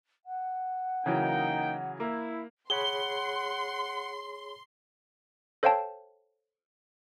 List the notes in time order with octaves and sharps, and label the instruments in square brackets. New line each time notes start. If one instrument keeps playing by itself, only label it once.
[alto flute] F#5
[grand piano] C#3 E3 F#3 [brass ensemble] A#3 D#4 G5
[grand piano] A#3 [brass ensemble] E4
[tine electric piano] G#4 C#5 B5 [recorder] F#5 [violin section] C6 [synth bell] G7
[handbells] A4 C5 C#5 F5 G5 A5